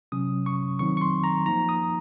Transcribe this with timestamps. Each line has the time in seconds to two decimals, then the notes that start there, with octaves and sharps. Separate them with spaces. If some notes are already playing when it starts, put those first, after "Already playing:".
0.12 C3 F#3 C#4 D#6
0.46 C#6
0.79 D#3 F#3 C4 D#4 C#6
0.97 C#6
1.01 C6
1.24 A#5
1.46 F3 A#3 D#4 A#5
1.69 D#6